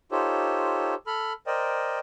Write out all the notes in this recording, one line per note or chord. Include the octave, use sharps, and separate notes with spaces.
D#4 F4 G4 A4 C5 C#5
A4 B5 F6
A#4 C5 D5 D#5 G5